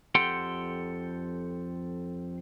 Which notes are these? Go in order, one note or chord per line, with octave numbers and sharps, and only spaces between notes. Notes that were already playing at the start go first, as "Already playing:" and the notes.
F2 G4 A4 F#5 G5 C6